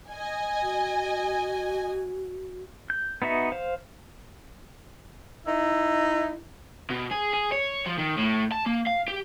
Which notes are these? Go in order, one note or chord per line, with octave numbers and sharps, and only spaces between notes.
D#5 G#5
F#4
G6
B3 D#4 F#4 E5
C5 F5
D#4 E4
B2
G#4
G#4
C#5
F3
D#3
A2
A5
A#3
F5
G4